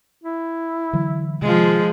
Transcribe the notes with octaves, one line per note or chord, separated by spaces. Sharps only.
E4
D3 E3 F#3
C3 D#3 F3 G#3 F4